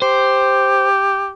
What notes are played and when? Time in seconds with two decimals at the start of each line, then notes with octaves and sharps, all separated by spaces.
0.02 G4 C5